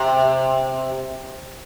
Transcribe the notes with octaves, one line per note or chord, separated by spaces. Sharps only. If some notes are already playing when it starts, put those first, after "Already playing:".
Already playing: C3